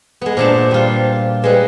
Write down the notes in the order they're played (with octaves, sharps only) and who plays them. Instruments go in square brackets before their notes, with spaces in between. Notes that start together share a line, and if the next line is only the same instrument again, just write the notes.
[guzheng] G#3 B3
[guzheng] A#2 D4 A5 [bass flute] C5
[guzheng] G3 F4
[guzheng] G3 G#3 [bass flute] B4